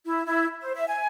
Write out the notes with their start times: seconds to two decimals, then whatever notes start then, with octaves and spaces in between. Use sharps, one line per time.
0.05 E4
0.26 E4
0.60 C5
0.75 E5
0.88 G#5